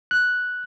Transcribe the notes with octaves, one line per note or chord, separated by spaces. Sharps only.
F#6